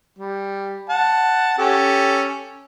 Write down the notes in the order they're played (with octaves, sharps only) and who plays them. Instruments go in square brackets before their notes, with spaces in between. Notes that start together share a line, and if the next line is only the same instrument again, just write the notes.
[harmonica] G3
F#5 A5
C#4 G4 A4